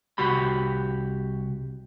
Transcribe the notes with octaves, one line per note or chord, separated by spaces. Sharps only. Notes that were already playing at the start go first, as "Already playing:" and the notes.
C2 F#4 G4 B5